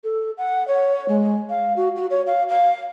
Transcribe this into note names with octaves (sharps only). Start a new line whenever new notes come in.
A4
F#5
C#5
G#3
F5
F#4
F#4
C#5
F5
F5